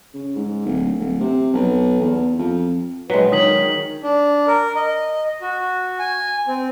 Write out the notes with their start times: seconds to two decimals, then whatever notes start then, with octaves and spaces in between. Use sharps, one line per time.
0.14 C#3
0.36 G#2
0.66 D1
0.99 D1
1.21 C3
1.53 B1
2.01 E2
2.39 F2
3.10 A#1 F#3 G#3 B4
3.32 D#3 C#5 D#6 B6 F#7
4.03 D4
4.47 A#4
4.76 D#5
5.41 F#4
5.99 G#5
6.47 C4